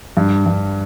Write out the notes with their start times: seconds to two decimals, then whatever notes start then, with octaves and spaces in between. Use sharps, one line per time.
0.17 G2
0.46 G2